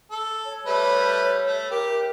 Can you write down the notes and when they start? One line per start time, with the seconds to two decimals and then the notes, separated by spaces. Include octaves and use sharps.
0.11 A4
0.46 C#5
0.66 G3 A3 B4
1.47 A3
1.71 G4 A#4